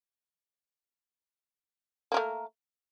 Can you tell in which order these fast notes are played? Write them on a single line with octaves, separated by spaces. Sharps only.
A#3 A#4 A3